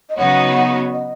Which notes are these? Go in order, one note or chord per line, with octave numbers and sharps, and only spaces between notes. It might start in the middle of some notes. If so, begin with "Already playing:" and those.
D#5
C#3 F#3 B3 D#4 F#4 C#5
D#5